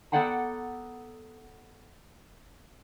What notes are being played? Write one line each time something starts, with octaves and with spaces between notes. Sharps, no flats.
B3 A4 D5 F#5 G5 A#5